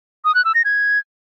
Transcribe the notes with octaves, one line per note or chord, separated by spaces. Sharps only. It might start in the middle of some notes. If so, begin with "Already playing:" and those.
D#6
F#6
E6
A#6
G#6